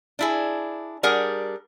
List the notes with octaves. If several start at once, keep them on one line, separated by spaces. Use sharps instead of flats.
D4 E4 G#4
G3 D4 G#4 A#4 F#5